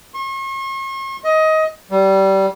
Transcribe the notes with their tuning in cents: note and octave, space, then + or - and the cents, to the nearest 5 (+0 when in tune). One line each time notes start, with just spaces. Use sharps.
C#6 -45
D#5 +20
G3 -20